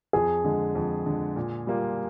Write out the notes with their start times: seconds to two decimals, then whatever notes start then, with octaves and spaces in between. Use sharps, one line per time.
0.13 F2 G#4
0.44 D3 G#3
0.75 F2
1.06 D3 G#3
1.36 A#2
1.67 G3 A#3 F4